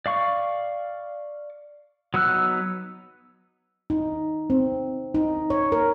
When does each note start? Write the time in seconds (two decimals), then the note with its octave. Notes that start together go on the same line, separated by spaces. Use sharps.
0.06 D5 F5 C#6
2.14 F#3 B3 D#4 E6 F#6
3.90 D#4
4.50 C4
5.15 D#4
5.50 C#5
5.72 A#4